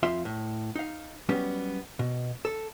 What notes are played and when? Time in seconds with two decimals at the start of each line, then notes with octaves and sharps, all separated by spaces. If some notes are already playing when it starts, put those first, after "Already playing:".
0.03 F2 F4 E5 F5 C6
0.25 A2
0.76 D#4 F5
1.29 F#3 G3 B3 C#4 G4
1.99 B2
2.45 A4